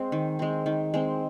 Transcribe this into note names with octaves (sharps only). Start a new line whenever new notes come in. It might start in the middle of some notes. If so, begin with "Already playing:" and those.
Already playing: G#3 C4
D#3
G#3 C4
D#3
G#3 C4